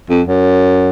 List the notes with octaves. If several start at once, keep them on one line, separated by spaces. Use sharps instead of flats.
F2
F#2